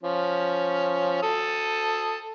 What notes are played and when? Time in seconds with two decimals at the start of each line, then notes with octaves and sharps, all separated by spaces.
0.03 F3 C#4
1.23 A4 D#6